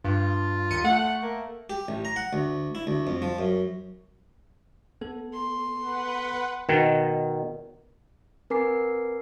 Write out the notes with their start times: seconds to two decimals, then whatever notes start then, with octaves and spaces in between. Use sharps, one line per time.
0.04 G2 F4
0.71 D#2 C#7 D#7
0.84 A3 F#5
1.22 A#3
1.70 G4
1.88 A1
2.05 A#5
2.16 F#5
2.33 D2
2.75 E4
2.87 D2
3.07 F2
3.22 F3
3.39 F#2
5.01 B3 A4
5.33 C6
5.79 B4 F#5
6.69 B2 D#3
8.50 C4 A#4 B4 G#5 D6 C7